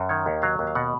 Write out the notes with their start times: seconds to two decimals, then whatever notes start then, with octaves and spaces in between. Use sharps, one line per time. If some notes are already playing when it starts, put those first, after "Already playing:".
Already playing: F#2
0.09 D#3 C#5
0.26 D#2
0.42 F#3 F5
0.59 D#2
0.67 F5
0.75 B2 F#5